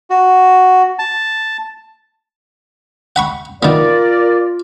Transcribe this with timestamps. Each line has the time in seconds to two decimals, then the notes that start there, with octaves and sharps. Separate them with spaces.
0.10 F#4
0.99 A5
3.16 F#5 B5 C#6
3.63 D#3 B3 F4 A#4 D5